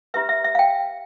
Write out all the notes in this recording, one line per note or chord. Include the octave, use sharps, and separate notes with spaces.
E4 G4 B4 E5
E5
E5
F5
G5